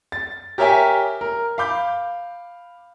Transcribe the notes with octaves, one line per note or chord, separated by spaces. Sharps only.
A6
G4 A#4 C#5 E5 G5 G#5
A#4
F5 B5 D6 G6